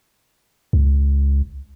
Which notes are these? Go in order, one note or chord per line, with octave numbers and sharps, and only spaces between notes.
C#2